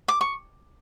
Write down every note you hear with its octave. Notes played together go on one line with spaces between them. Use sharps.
D6
C#6